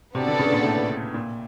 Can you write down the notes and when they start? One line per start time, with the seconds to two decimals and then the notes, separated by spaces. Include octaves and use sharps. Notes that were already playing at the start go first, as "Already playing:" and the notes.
0.15 C3 B3 D4 F#4 A4 D5
0.27 D3
0.39 C#3
0.52 A#2
0.64 A2
1.14 A#2